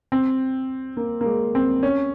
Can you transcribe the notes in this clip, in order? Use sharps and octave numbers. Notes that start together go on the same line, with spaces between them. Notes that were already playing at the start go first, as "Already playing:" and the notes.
C4
A#3
A#3
G#3
C4
C#4